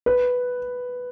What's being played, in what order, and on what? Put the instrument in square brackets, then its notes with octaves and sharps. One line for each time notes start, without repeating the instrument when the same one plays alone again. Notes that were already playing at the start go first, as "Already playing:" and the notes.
[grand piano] B4